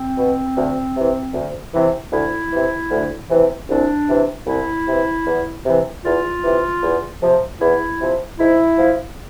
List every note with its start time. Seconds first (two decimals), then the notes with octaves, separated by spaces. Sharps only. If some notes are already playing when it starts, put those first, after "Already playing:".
Already playing: C4
0.17 B2
0.56 D2
0.96 C3 E3
1.34 D2
1.74 C3 E3
2.12 D2 E4
2.51 C3 E3
2.91 D2
3.30 C3 E3
3.69 C2 D4
4.08 C3 E3
4.47 C2 E4
4.87 C3 E3
5.26 E2
5.65 C3 E3
6.04 E2 F4
6.44 C3 E3
6.83 E2
7.21 C3 F3
7.61 E2 E4
8.00 C3 F3
8.39 G#2 E4
8.78 F3